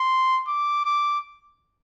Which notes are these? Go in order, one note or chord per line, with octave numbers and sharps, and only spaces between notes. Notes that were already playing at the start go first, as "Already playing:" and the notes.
Already playing: C6
D6
D6